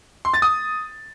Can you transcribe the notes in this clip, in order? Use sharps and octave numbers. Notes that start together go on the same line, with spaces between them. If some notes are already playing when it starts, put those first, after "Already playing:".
C6
A6
D#6